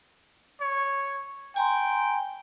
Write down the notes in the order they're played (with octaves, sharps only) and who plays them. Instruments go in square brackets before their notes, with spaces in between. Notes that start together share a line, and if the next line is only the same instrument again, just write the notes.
[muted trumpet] C#5
[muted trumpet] G5 [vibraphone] G#5 A#5 C6